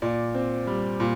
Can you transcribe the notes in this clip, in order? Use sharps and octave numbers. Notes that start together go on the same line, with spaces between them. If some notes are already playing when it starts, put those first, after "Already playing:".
A#2 D5
C4
G3
A#2